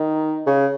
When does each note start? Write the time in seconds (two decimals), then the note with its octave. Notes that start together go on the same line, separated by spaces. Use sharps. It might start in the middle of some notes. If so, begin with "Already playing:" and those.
Already playing: D#3
0.46 C#3